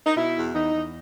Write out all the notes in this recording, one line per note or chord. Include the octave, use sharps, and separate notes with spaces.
D#4
B2 E4
E2
E2 D#4
E2